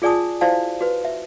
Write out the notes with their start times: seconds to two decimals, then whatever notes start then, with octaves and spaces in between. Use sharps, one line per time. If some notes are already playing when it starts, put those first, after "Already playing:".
0.02 F4 G#4 D5 G#5 A5 D#6
0.41 E4 F#4 C5 D5 F5 A5
0.81 F#4 B4
1.05 E5